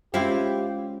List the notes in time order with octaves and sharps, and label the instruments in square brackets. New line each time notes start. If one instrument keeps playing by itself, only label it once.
[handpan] G#3 C#4 [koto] C4 E4 [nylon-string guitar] F4 F5 [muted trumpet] G4